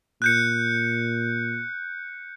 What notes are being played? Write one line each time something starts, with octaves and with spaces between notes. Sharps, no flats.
A#2 F#6 G6 C#7